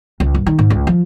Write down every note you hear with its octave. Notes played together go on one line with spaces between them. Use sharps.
C#2
G2
D#3
G#2
C#2
F3